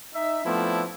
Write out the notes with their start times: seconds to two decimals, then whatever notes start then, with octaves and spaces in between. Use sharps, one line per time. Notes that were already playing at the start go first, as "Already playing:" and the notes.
0.14 D#4 E5
0.45 F3 A3 B3 C4 D4 E4